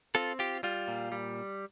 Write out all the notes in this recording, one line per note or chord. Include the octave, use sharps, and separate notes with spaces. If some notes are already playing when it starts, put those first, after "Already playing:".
C4 F4 A4
F4 G4
G3 F4
A#2
G3